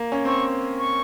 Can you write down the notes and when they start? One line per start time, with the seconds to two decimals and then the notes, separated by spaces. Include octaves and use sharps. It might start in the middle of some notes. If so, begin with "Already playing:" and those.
Already playing: A#3
0.12 C#4
0.25 C4 C#6
0.79 C#6